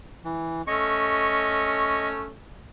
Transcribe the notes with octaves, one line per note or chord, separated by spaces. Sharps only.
E3
A3 C#4 D#5 C#6